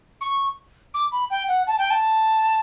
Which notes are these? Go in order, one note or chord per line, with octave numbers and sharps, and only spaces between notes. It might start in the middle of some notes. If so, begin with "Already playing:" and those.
C#6
D6
B5
G5
F#5
A5
G5
A5